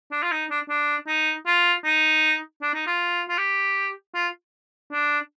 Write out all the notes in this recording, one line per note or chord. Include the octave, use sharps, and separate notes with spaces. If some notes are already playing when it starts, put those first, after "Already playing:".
D4
F4
D#4
D4
D4
D#4
F4
D#4
D4
D#4
F4
F4
G4
F4
D4